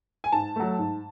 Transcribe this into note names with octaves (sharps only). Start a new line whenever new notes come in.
G#5
G#2 A5
F#3 A3
G#2